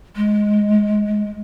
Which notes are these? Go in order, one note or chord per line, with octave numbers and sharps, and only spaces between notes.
G#3